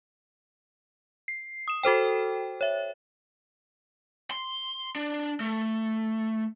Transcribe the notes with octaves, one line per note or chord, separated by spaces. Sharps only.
C7
D#6 E7
F#4 A4 C5 G5
C#5 E5
C6
D4
A3